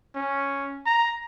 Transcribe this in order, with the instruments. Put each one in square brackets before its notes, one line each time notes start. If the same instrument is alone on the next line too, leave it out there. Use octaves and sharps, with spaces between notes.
[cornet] C#4
A#5